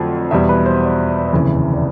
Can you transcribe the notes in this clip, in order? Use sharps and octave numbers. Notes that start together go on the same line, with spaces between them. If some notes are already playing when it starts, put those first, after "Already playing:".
Already playing: F2 D3 F#3 A3
E2 B2 G3 E5
B4
C5
D5
F1 D#2 C#3 E3
D5